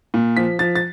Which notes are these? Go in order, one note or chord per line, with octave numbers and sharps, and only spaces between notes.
A#2
F3 B6
F3 A6
A6